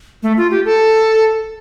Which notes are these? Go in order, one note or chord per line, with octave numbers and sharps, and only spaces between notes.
A3
F4
G4
A4